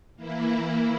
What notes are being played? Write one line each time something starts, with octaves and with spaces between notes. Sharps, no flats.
E3 A#3 E4